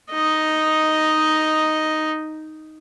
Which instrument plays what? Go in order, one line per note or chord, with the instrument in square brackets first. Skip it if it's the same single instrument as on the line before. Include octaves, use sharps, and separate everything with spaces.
[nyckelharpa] D#4 D#5